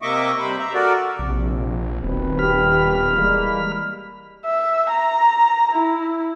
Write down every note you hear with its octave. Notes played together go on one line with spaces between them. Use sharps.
C3 A#3 D#5 E5 C#6 D6
G2 C3 C5 B5
E5 A#5
F#4 A4 A#4 D5
A#1 C3
D#1 B2 D#3 C4 B4
G4 B5 F6
E3 G3 G#3 A#3
E5
A#5
E4